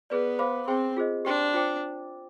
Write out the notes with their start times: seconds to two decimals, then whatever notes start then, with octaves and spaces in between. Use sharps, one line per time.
0.10 B3 G#4 B4 D5
0.39 C5 F5 B5 D6
0.67 C4 G#4 C5 G5 C6
0.97 F4 G#4 C5 D#5
1.25 D4 G4 C5 G5 C6
1.54 F4 C5 G5 D6